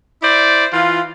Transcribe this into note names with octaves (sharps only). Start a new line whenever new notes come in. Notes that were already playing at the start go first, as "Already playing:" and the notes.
E4 C5 D5
E3 F4